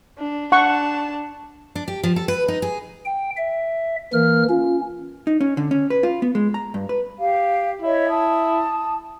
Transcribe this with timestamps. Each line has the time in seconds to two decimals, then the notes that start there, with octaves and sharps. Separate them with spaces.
0.18 D4
0.52 D4 F#5 A5 C#6
1.75 D4
1.88 G4
2.03 F3
2.16 A4
2.28 B4
2.48 D#4
2.62 G#4
3.05 G5
3.37 E5
4.13 E3 A#3 F6
4.50 C#4 F4
5.27 D#4
5.41 C#4
5.57 D3
5.71 C#4
5.90 B4
6.03 F4
6.22 B3
6.35 G#3
6.54 A#5
6.74 G2
6.89 B4
7.18 G4 F5
7.81 E4 C#5 D#5 E5
8.08 A5 D#6